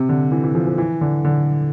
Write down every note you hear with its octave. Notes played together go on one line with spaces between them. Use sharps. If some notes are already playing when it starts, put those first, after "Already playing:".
Already playing: C3
D3
E3
E3
F3
F3
E3
D3
D3